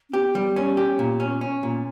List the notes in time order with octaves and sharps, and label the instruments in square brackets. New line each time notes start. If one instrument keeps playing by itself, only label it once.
[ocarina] C#4
[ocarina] B3 [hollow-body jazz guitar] G4
[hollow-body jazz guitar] G3
C#4
G4
A#2
C#4
C#4
A#2